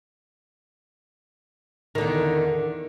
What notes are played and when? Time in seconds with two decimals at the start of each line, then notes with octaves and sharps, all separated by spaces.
1.95 D#3
1.98 D3
2.01 E2